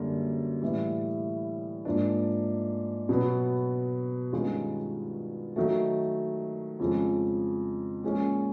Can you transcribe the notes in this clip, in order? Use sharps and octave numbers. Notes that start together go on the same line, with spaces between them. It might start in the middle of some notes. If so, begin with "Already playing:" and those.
Already playing: F#2 D3 G3 A#3
A2 E3 G3
G#2 F3 A#3 D4
B2 F#3 B3
G2 D#3 G#3 C#4 F4
D#3 F#3 A3
F2 C#3 F3 G#3
A#2 F3 G#3 C#4